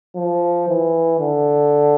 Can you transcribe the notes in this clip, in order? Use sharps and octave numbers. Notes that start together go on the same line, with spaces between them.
F3
E3
D3